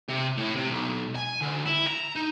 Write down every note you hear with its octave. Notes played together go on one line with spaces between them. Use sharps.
C3
A2
C3
B1
G#5
D2
E4
A#5
D#4